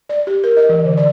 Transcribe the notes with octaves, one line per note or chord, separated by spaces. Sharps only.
D5
G4
A#4
D#5
E3
D3
D5